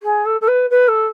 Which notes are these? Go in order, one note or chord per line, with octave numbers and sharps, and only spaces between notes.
G#4
A4
A4
B4
B4
A4